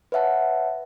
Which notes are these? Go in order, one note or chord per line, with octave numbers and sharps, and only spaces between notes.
B4 C#5 E5 F#5 A5